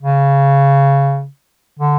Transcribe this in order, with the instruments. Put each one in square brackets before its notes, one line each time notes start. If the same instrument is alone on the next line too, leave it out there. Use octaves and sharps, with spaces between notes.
[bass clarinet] C#3
D3